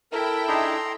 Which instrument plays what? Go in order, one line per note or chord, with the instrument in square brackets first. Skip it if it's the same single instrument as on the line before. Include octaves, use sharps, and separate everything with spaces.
[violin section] E4 G5 [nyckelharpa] A4 [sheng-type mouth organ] A#4
[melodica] D4 D#4 G#4 [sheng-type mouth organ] A#5 C6